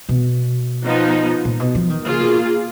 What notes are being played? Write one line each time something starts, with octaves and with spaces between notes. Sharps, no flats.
B2
F3 B3 D#4
A#2
B2
F3
D#3
C#3 A#3 F4 G#4
B2
A#2